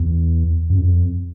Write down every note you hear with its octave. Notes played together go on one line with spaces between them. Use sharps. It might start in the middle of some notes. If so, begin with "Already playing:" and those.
Already playing: E2
F#2
F2